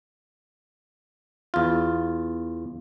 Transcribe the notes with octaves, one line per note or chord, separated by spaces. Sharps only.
E2 F4